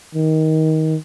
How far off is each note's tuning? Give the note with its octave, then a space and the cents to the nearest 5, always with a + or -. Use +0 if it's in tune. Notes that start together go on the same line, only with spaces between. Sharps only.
D#3 +20